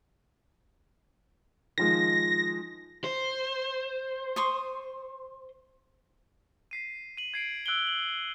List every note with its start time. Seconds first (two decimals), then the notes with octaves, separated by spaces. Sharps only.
1.78 D#3 F3 G#3 A#6
3.04 C5
4.36 C6 C#6 D#6
6.71 B6 C7 D#7
7.17 D#7 F#7
7.34 G#6 C7 D7
7.66 E6 F#6 D7 F#7 G7
7.87 F#7